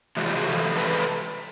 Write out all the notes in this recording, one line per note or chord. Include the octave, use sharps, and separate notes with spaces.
C3 E3 G#3 F#4
F4 G4
F#4 G#4
C3 E3 G4 A4
C3 E3 G#3 A4 B4